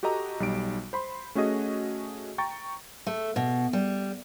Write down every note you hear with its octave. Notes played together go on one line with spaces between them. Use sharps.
F#4 G4 A4 D#5 A#5
B1 G3 D#4 D7
C5 B5 C6
A3 C#4 F#4 G#4 D#5
G5 A#5 C#6 A6
A3
B2
G3